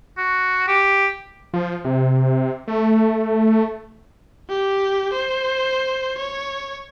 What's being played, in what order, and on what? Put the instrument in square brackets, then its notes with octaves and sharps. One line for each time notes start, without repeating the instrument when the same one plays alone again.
[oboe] F#4
G4
[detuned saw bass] F3
C3
A3
[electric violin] G4
C5
C#5